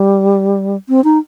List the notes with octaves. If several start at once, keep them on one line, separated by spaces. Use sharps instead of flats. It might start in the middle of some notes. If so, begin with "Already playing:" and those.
Already playing: G3
C4
D#4